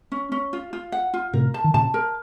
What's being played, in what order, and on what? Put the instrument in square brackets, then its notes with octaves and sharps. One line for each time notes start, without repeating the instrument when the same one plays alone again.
[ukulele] C#4
C#4
F4
F4
F#5
F4
[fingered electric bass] A2 C3 [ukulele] A#4
[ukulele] A5
[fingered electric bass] D#3
[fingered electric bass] A#2 C#3 [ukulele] A5
[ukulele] A#4